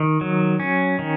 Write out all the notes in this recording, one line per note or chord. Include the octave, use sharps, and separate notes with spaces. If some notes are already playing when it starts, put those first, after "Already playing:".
Already playing: D#3
F#3
C#4
D#3